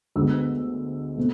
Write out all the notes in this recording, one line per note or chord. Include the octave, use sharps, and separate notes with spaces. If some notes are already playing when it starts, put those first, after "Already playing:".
D2 D3 G#3 B3 E6
B2 A3 C4